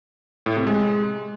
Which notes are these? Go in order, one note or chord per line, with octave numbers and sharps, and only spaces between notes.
A2
C3
G#3